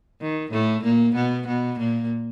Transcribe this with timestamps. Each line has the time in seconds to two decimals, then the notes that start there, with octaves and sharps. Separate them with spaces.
0.21 D#3
0.52 A2 A3
0.84 A#2 A#3
1.15 B2 B3
1.47 B2 B3
1.79 A#2 A#3